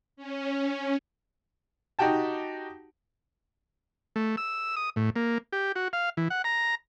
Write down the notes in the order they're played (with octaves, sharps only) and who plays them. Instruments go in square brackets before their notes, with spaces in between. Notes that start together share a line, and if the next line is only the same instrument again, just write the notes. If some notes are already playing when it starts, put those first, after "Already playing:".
[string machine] C#4
[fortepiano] D#4 F#4 G4 G5 A5
[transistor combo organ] A3
E6
D#6
A2
A#3
G4
F#4
F5
E3
F#5
A#5